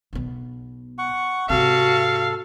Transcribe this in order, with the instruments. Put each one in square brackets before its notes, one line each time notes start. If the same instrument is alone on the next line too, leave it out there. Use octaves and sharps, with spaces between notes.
[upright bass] B1 B2
[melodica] F#5 C#6
[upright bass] G#2 C3 [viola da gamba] F#4 [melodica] A4 [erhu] F5